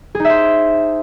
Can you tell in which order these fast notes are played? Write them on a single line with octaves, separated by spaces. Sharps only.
G#4 D#4 E5 C5